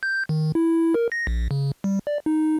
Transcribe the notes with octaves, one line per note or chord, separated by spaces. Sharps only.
G6
D#3
E4
A#4
A#6
A#1
C#3
G3
D5
D#4